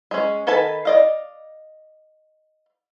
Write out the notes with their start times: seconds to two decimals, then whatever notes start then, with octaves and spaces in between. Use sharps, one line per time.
0.11 G#3 C#4
0.47 D#3 A4 B4 G#5 A5
0.85 D5 D#5 F5